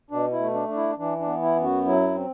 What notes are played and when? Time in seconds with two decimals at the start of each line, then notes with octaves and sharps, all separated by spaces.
0.11 B2 D4
0.32 E4
0.39 A3
0.54 D4
0.68 D4
0.76 E4
0.97 E3 D4
1.20 D4
1.26 B3
1.42 E4
1.56 F#2
1.64 F#4
1.85 F#3 E4
2.15 C4